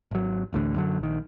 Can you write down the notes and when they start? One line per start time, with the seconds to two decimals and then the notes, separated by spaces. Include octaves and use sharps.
0.11 G#1 F#3
0.53 A1 D2 A2 D3
0.76 F#2 D3 F#3
0.99 A#1 D#3